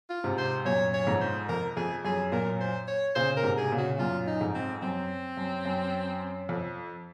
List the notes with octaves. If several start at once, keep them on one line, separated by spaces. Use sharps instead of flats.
F4
G#2 C3
C5
F#2 A#2 C#5
C#5
F2 G#2
C5
F2 A#4
F2 G#4
F#2 G#4
F#2 A#2 A#4
C5
C#5
A#2 C#3 C5
A#4
G#2 C3
G#4
A#2 C#3
F#4
F#2 A#2 F4
D#4
F2 G#2
C4
F#2 C4
F#2
F#2
F2